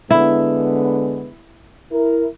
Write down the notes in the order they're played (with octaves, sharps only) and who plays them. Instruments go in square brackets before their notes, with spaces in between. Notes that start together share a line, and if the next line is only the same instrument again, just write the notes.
[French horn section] D3 G#3 B3 [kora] E4
[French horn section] E4 A#4